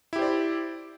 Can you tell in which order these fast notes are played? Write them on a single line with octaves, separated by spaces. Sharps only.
E4 G4 C5 D5